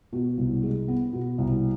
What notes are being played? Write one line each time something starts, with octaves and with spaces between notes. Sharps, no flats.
B2
C2
G#3
B3
B2
C2